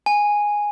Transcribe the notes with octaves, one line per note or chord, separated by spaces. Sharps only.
G#5